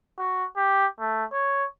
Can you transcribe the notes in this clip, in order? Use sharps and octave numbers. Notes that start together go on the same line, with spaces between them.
F#4
G4
A3
C#5